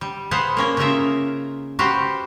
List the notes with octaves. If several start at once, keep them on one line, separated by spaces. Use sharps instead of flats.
G3
G#4 B4 C5 F5 F#5 A5
A#3 C#4 A#4
C#3 D#4 F4 A#4 E5
F#4 G4 B4 C5 F5